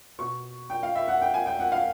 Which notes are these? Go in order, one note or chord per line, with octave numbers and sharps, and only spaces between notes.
B2 C#6
G5
F5
E5
F#5
G5
G#5
G5
F#5
F5